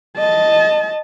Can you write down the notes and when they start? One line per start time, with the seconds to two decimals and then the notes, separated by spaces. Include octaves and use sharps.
0.18 D#5 A5